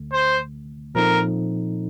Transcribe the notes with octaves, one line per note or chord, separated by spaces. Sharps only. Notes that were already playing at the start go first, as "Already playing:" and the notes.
Already playing: D2 D3 A3
C5
A#2 F3 C4 D#4 A4 A#4